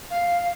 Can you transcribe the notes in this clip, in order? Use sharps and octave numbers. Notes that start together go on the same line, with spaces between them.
F5